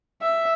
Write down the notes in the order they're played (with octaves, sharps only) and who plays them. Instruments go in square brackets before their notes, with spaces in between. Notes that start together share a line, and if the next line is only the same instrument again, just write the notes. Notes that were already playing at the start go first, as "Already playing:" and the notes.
[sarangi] E5